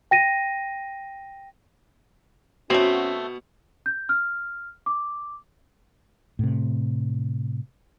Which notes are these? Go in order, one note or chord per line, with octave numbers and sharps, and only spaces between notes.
G5 A#6 D#7
B2 A3 C4 C#4 F#4
G6
F6
D6
A2 C3